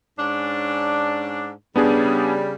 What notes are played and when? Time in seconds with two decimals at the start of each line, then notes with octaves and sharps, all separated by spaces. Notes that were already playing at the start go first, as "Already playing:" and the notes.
0.18 G#2 C#4 D4
1.76 C#3 G3 B3 D4 G#4